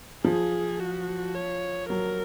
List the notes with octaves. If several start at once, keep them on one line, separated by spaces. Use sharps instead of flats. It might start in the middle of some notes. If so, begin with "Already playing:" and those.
F3 G#4
F#4
C#5
F#3 A#4